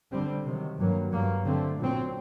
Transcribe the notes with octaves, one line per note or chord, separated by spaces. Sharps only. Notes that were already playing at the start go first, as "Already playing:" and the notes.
D3 G3 C4
C3 D#3 F#3
G2 F#3 A#3
G2 F#3 A#3
D3 A3 C4
A#2 F#3 C4